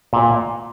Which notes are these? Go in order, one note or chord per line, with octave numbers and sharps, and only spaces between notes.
A#2